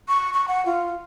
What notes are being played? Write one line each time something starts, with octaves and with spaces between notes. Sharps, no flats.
C#6
C#6
F#5
F4